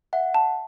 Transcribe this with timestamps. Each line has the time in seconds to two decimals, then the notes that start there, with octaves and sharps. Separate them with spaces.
0.13 E5 F#5
0.34 A5